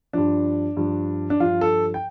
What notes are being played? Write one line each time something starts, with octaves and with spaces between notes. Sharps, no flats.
G2 F3 D4
G2 F3
D4
G2 F3 F4
A4
G5